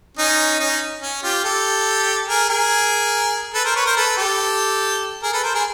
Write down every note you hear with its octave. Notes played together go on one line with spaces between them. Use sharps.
C#4 D#4
C#4 D#4
C#4
F4 G4
G4 A4
G#4 A#4
G#4 A#4
A4 B4
A#4 C5
B4 C#5
A#4 C5
A4 B4
G4 A4
G#4 A#4
A4 B4
A#4 C5
G#4 A#4